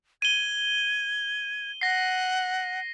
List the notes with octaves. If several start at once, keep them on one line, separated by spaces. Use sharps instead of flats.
G#6 D#7 G7
F#5 A#6 C7